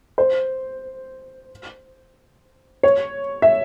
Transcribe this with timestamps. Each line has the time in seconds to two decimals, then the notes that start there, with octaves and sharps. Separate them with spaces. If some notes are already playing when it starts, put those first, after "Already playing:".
0.18 C5
2.83 C#5
3.42 E5